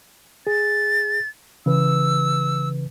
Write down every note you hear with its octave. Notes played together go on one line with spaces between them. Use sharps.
G#4 A6
C#3 E3 B4 E6